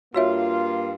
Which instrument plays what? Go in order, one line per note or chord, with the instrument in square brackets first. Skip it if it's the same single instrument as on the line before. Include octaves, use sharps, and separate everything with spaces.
[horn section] G2 A#3 F4 [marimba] F#4 C#5 E5